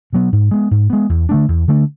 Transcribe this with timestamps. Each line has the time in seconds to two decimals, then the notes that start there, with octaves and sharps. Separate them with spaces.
0.13 B2 F#3 B3
0.32 G#2
0.51 G#3 B3
0.71 G#2
0.90 G#3 B3
1.09 E2
1.29 D3 A3 D4
1.48 E2
1.68 D3 A3 D4